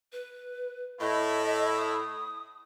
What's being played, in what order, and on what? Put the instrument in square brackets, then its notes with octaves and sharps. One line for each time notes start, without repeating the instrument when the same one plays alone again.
[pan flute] B4
[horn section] A2 E4 [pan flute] D#5
[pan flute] D#6